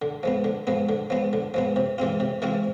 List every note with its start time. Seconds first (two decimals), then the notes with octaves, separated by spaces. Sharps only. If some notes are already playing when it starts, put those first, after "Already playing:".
0.02 D3
0.23 F3 G#3 B3
0.44 D3
0.67 F3 G#3 B3
0.89 D3
1.10 F3 G#3 B3
1.33 D3
1.54 F3 G#3 B3
1.76 C3
1.98 E3 G#3 C4 F4
2.20 C3
2.42 E3 G#3 C4 F4